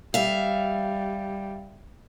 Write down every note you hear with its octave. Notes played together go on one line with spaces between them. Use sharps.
G3 E5 F5